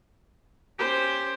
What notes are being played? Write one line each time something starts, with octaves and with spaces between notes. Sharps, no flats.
C#4 G4 C5